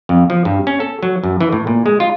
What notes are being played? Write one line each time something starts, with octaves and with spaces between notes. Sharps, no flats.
F2
F3
G2
C#4
A4
F#3
F#2
E3
A2
A#2
G#3
F4